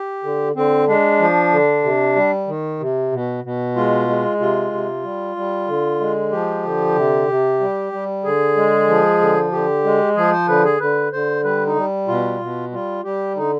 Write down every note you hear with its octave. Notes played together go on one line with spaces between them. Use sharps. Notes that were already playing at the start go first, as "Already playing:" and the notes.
Already playing: G4
D3
D3 C4
G#3 D4
F3
D3
C3
G3
D#3
C3
B2
B2
G#3 F4
G#3
C3 F4
C3
G3
G3
D3
G#3
F3 G4
D3
C3
C3
G3
G3
D3 G#4
G#3
F3
D3
D3 G4
G#3
F3 G#4
C5
D3 B4
G#4
D3 B4
D3 C5
G3 B4
D#4
G3
B2 F4
B2
G3 F4
G3 G4
D3 D#4